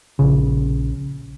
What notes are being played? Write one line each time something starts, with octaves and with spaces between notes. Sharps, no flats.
A#1 C#3